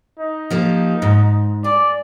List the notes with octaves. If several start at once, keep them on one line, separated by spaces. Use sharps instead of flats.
D#4
F3 A#3 G4
G#2
G#4 D5